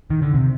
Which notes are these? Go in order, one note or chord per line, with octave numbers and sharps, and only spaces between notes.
D#3
D3
C3